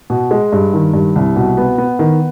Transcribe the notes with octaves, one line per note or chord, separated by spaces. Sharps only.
B2
G#3
G2
D#3
G2
C2
B2
B3
B3
D#3